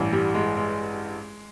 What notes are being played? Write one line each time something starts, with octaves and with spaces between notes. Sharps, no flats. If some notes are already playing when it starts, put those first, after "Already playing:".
Already playing: A1 G2 E3
G3
G#3
G#3